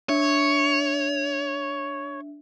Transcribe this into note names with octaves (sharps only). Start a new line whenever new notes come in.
D4 C#5 E5